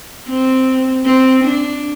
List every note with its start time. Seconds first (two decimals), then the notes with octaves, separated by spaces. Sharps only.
0.29 C4
1.05 C4
1.44 D4